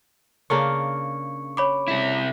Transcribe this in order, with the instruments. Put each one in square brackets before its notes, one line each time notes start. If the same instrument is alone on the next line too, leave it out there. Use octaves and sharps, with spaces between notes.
[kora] C#3 A#3 D4 [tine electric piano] C#6
[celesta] C#5 B5 D6
[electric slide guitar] C3 E4